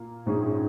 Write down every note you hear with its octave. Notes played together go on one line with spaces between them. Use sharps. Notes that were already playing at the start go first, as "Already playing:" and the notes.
Already playing: A#2 A#3
A#1 G#2 G#3 C#4 G#4